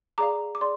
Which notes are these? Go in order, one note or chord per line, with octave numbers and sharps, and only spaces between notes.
G#4 D5 F5 A#5 D6
D6
G#4 D5 C6